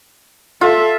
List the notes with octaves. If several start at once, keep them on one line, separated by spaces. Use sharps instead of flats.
F4 A4 E5